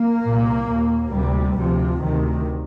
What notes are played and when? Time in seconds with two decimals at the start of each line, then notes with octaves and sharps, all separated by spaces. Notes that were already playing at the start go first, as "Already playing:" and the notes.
Already playing: A#3
0.23 C2 A#2
0.67 D#2
1.12 D2 C3 G3
1.57 D2 C3 F3
2.02 D2 C3 D#3